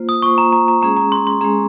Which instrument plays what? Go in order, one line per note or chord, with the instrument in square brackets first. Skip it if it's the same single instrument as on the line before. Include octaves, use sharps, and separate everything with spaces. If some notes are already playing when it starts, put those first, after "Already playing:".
Already playing: [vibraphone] A#3 F4 C5
[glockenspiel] D#6
[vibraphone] A#3 F4 C5 [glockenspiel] C#6
[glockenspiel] A#5
A#5
A#5
[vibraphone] G#3 C#4 G#4 [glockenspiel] A#5
[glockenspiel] A#5
C6
C6
[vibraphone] G#3 C#4 G#4 [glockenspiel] A#5